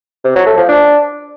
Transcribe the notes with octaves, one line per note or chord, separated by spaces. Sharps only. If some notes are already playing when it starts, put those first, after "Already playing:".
C3
F#3
A3
F3
D4